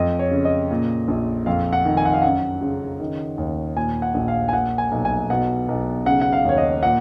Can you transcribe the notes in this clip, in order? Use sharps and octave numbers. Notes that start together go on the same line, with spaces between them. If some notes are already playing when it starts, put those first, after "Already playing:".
Already playing: F2 D#5
C#5
C#3
D#5
A#2
A#1
F2 F5
F#5
D#3
G#5
F#5
F5
F#2 F#5
C#3
D#3
D#2
A#2 G#5
F#5
A#1
F5
G#5
A#2 F#5
G#5
B1
G#5
B2 F#5
B1
C#3 F#5
F#5
F5
D#2 C#5
D#5
A#2 F#5